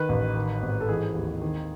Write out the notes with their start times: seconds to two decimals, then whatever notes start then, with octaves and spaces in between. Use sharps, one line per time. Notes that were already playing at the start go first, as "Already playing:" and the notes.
Already playing: D#3 B4
0.09 A1
0.36 D#3
0.62 G#1
0.81 A4
0.89 E3 G#4
1.15 D#2
1.42 D#3